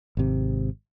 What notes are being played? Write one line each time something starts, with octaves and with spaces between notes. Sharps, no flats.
G#1 C3